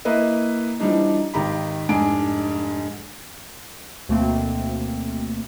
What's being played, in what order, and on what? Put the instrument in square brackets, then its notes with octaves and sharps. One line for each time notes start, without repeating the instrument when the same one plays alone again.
[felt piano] A#3 E4 B4 D#5
E3 F3 G3 D4 D#4
G#1 D#3 G4 A#5 B5
F1 G#2 D4 G#5 D7
[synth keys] D2 B2 A3 A#3 C4